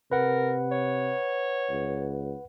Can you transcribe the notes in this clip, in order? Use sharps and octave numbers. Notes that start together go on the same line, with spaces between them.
C3 A#4 B4 F#5
C#5
C#2